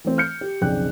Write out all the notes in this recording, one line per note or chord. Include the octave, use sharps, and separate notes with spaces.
E3 A3 C4
F6 G6 C#7
G4
B1 F2 C#3 D5 G5 F#6